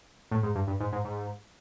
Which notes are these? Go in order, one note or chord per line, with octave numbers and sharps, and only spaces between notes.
A2
G#2
G2
G2
G#2
G#2
G#2